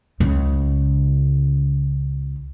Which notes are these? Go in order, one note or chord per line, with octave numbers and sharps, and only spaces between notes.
C#2 C#3